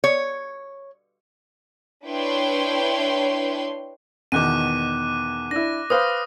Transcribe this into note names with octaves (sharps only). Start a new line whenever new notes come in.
C#5
D4 E4 B4 C#5 G5 C6
E2 B2 D#3 D6 F#6 D#7
D4 E4 A#6
B4 C5 F5 D#6 F6